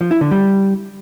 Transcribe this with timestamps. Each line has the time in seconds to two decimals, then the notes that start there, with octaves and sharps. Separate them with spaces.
0.01 F3
0.11 E4
0.21 D3
0.31 G3